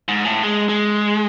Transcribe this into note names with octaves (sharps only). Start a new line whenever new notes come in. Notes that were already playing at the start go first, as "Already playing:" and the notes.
G#2
A2
G#3
G#3